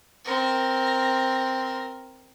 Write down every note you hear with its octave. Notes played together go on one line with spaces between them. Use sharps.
C4 A#4